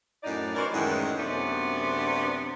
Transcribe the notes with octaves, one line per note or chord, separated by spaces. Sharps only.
F#2 A2 D#4 D5
E3 F#4 A#4 C5 D5
F#2 A2 D#3 E3 F#3 G#3
F#2 C3 A3 B3 D4 D5